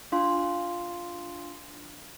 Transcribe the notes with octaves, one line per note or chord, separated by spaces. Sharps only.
D4 F4 F5 C6